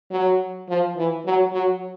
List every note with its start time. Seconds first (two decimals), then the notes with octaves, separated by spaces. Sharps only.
0.11 F#3
0.69 F3
0.97 E3
1.25 F#3
1.53 F#3